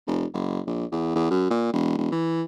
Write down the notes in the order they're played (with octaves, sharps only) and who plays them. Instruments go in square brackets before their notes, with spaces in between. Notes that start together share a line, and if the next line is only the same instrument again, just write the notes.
[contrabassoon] F1
F#1
A#1
E2
E2
F#2
A#2
E1
E1
E3